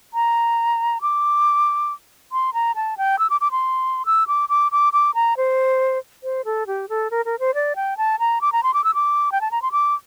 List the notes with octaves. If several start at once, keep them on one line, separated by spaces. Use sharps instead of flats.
A#5
D6
C6
A#5
A5
G5
E6
D6
D6
C6
E6
D6
D6
D6
D6
A#5
C5
C5
A4
G4
A4
A#4
A#4
C5
D5
G5
A5
A#5
D6
A#5
C6
D6
E6
D6
G5
A5
A#5
C6
D6